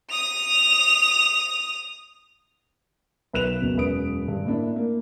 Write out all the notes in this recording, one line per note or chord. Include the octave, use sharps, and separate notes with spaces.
D#6 F7
B1 B4 F#6 E7 F7
F#1 B2
E1 F#2 B4 D#6 D7
G2
A2 A#3 D4 E4
A#3